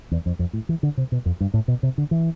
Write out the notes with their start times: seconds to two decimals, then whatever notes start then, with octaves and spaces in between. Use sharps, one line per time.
0.11 E2
0.26 F2
0.39 F2
0.53 A2
0.69 E3
0.83 D3
0.97 C3
1.12 B2
1.25 F2
1.40 G2
1.54 A2
1.68 B2
1.83 C3
1.98 D3
2.11 E3